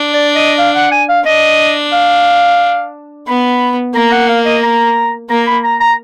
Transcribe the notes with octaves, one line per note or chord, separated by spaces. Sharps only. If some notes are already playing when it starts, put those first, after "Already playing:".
Already playing: D4
D5
D#5
F5
F#5
G#5
F5
D4 D#5
F5
B3 B5
A#3 A#5
F#5
F5
D#5
A#5
A#3 A#5
B5
A#5
A#5